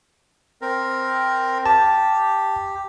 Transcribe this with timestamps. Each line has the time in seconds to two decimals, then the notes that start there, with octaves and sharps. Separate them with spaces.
0.62 C4 A#4
1.66 G4 A5